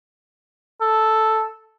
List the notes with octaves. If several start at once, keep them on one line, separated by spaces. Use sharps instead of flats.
A4